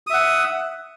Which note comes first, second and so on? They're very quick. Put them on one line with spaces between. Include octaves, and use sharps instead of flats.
D#6 E5 F#5